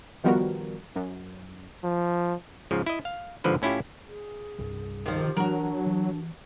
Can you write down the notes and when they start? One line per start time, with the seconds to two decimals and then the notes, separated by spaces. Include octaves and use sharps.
0.24 D#3 F3 G3 B3 F#4 A#4
0.96 F#2
1.84 F3
2.71 G#2 C#3 F3
2.86 E4 D#5
3.05 F5
3.44 G1 G#2 D3 F3 B4 C5
3.62 A2 C#4 E4 F4 G4
4.07 G#4
4.59 C2 G2
5.06 C3 D#3 F3
5.37 E3 F#3 D4 F#4 A#4
5.86 E3